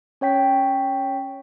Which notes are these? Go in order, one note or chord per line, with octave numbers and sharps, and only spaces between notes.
C#4 C#5 G5 B6